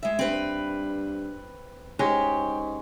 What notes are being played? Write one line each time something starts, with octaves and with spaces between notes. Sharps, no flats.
G#3 E5
G2 C4 B4
G#2 G#3 C#4 G4